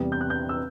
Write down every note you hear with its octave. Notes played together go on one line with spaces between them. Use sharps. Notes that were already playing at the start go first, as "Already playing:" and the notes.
Already playing: E2 C3 G3
G6
F#6
G6
E6